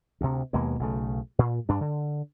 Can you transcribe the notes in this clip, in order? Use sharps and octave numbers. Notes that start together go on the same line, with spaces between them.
D2 C3
D#2 B2 G#3 A#3
B1 C#3 A3
A#2
G2 D4
D3